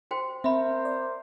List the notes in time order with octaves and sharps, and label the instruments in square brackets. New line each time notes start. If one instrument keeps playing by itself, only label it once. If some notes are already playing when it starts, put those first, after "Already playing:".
[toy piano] F#4 C5 G5
[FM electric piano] C4 [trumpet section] A#4 C5 [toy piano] E5 B5
[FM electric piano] D5